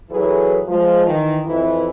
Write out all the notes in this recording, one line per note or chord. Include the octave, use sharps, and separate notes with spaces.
E3 F#3 E4 G#4 A4 B4
F3 G#3
D#3 E3
F2 E3 E4